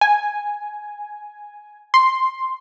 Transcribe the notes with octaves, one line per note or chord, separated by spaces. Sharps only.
G#5
C6